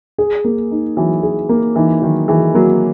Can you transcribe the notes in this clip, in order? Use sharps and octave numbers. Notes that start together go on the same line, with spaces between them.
G#4
A#3
D#4
E3 F#3
G#4
A#3
E3 D#4
D#3 F#3
E3 G#4
F#3 A#3